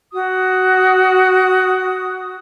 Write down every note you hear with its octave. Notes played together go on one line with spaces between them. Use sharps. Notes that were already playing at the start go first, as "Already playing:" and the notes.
F#4 D#6